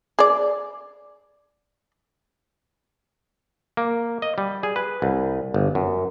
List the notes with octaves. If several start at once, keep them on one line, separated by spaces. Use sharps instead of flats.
G#4 D5
A#3
D#5
G3
G#4
B4
C2
G1
F#2